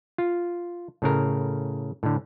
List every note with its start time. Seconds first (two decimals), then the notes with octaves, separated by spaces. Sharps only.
0.18 F4
1.02 A2 C#3 A#4
2.03 A2 D3